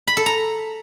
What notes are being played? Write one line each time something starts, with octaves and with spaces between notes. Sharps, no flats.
B5
A4
A#5